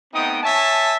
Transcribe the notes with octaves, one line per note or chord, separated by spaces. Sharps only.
A3 B3 C4 D#4 G5 D#6
C#5 E5 G#5 A5